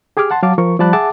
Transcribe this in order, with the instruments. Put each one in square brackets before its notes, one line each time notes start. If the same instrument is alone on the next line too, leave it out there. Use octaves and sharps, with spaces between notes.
[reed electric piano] G4 G#4 G#5 D6 F6
F#5 A5 C6
F#3 F#4 F5 A5 D6
F3 A#4 C#6
F3 G3 D5 A5 B5 F#6
G#4 E5 F#5 A5 D6